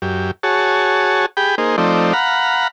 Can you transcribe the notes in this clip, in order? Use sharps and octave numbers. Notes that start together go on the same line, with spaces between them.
F#2 G4
F#4 G#4 C#5 A5
G4 G#4 G5 B5
A#3 D#4 G#4 C5
F3 A3 C4 D#4 D5
F5 F#5 A#5 B5